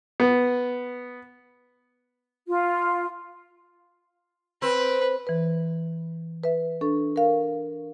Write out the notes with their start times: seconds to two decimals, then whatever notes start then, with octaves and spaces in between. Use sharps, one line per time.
0.20 B3
2.47 F4
4.62 C4 B4
5.27 E3 B4
6.44 B4 E5
6.81 D4 A4 C#6
7.16 A#4 F5